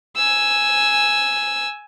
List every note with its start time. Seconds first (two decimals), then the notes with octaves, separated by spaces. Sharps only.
0.17 G#5 E6